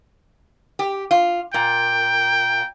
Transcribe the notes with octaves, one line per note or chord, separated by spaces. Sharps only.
G4
F4
A#2 G5